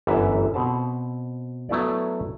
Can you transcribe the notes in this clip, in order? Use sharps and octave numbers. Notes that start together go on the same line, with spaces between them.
G1 F#2 E3 E5
B2 C4 A5
F#3 A3 B3 E4 A4 D5